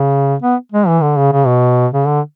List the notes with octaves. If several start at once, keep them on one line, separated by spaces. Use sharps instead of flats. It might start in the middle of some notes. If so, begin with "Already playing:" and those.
Already playing: C#3
B3
G#3
E3
D3
C#3
C#3
B2
C#3
D3